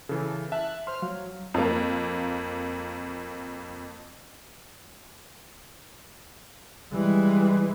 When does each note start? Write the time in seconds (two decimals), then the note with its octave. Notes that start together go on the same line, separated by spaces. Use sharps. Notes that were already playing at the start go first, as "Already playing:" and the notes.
0.09 C#3 E3 A4
0.52 E5 A5 F#6
0.87 C5 C6 F6
1.02 F#3 F5
1.54 F2 A#3
6.93 E3 G3 G#3